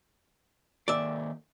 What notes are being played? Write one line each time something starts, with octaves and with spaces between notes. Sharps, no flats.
D#3 A#3 A4 D5 E5